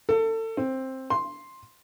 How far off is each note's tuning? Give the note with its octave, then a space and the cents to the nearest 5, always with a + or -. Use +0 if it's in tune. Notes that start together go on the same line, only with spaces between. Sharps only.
A4 +30
C4 +10
C6 +5